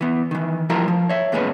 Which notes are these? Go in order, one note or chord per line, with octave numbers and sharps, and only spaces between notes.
E3 B3
D#3 E3
F3 G3 E4 A#4 C5 A#5
F3
C#5 E5
E2 A#2 G#3 B3 C#4 B4